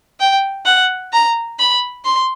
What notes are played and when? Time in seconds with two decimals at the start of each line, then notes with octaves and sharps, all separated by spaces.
0.20 G5
0.65 F#5
1.13 A#5
1.59 B5
2.05 C6